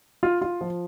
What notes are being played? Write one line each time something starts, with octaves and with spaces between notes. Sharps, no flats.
F4
F4
F3